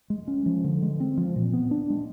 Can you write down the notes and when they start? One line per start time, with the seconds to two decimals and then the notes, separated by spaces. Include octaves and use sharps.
0.10 G#3
0.28 C#4
0.46 F3
0.64 D3
0.82 G#3
1.00 C4
1.17 F3
1.36 A#2
1.53 B3
1.71 D4
1.90 G#3